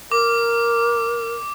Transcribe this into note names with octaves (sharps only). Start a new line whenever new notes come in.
A#4 D6